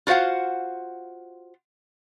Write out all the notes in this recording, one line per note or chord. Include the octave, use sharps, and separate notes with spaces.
F4 F#4 C5 F5 F#5